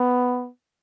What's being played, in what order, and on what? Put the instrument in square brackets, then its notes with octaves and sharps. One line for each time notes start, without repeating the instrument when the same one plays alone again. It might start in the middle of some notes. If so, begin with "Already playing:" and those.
Already playing: [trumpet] B3